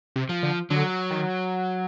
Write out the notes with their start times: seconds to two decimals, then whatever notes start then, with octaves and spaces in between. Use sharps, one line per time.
0.16 C3
0.29 F3
0.43 D3
0.70 D3 F#3
1.11 D#3